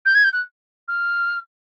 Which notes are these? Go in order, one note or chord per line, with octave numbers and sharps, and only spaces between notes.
G6
G#6
G6
F#6
F6